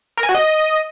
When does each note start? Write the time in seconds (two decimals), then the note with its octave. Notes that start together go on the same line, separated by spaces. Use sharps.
0.17 A#4
0.23 G#5
0.29 F#4
0.35 D#5